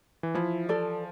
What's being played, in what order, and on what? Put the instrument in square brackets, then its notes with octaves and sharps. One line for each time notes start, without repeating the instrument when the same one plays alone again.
[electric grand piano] E3
[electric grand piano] F3 [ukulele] E4
[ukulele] A4 D5